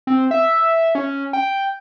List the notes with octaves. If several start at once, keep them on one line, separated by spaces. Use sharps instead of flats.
C4
E5
C#4
G5